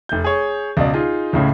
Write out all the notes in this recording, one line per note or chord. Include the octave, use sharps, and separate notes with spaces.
F1 G6
G#4 C#5
C#2 B2 D5
D#4 F4 G#4
C#2 A2 C#3